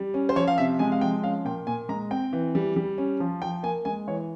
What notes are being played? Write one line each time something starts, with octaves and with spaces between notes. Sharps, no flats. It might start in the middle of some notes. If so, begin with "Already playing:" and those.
Already playing: G3
C#4
C5
F3 C#5
F5
C3 E5
G#3 G#5
F5
F3 G5
C#4 F5
A#2 G5
A#2 G#5
G#3 A#5
C4 G5
E3
G3
G3
C#4
F3
F3 G5
A#3 G#5
G#3 G#5
E3 C#5